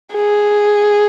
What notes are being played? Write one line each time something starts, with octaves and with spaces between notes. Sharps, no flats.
G#4